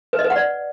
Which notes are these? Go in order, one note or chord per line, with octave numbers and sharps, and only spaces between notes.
B4
D#5
B4
F#5
D5